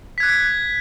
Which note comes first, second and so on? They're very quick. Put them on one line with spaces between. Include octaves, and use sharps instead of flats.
B6 G#6 F#6